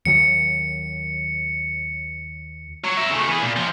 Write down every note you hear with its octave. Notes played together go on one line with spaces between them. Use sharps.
D#2 D#3 F#3 C#7
F#3
A#4 E5
C#3 A3
E3 G#4
A#2
F#2 F3